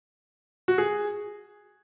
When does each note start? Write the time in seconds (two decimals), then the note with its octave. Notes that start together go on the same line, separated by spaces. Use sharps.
0.68 F#4
0.78 G#4